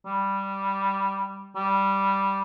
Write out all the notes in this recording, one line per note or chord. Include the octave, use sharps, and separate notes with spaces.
G3
G3